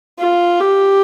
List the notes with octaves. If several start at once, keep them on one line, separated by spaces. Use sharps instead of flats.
F4
G4